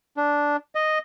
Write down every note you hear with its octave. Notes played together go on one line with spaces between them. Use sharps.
D4
D#5